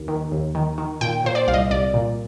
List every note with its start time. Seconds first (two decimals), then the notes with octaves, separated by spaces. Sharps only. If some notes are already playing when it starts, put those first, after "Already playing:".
Already playing: D#2
0.08 D#3
0.32 D#2
0.55 D#3
0.78 D#3
1.01 A#2 G5
1.24 A#2 C5
1.35 D5
1.47 C2 F5
1.54 D#5
1.70 C2 D5
1.94 A#2